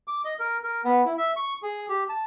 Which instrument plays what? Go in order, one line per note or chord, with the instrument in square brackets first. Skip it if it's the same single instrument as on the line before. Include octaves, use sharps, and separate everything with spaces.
[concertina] D6
D#5
A#4
A#4
B3
E4
E5
C#6
G#4
G4
A5